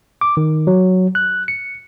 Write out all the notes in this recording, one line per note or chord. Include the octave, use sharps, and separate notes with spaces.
D6
D#3
F#3
F#6
C#7